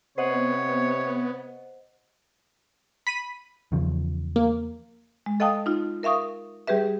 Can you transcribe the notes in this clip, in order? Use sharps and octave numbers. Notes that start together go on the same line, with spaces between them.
C3 B3 C5 C#5 D#5 F#5
B5 B6 D#7
E2 C#3 F3
A#3
G#3
A4 D#5 F5 G5 A5 D#6
D#4 F4
A#4 E5 F5 C#6 D#6
G3 G4 G#4 B4 E5